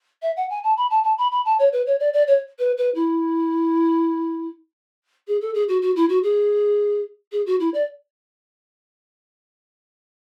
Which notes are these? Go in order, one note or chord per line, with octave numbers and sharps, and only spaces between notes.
E5
F#5
G#5
A5
B5
A5
A5
B5
B5
A5
C#5
B4
C#5
D5
D5
C#5
B4
B4
E4
G#4
A4
G#4
F#4
F#4
E4
F#4
G#4
G#4
F#4
E4
D5